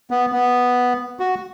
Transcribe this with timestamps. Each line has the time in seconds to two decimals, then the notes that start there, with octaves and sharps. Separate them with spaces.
0.11 B3
0.32 B3
1.20 F#4